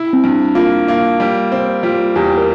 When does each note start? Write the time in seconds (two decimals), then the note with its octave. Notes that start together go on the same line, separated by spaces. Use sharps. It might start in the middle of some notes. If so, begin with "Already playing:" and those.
Already playing: E4
0.13 C4
0.24 G2
0.55 A#3 F4
0.88 A#3
1.20 G3
1.52 C4
1.83 G3 F4
2.16 E2 G4
2.38 A#4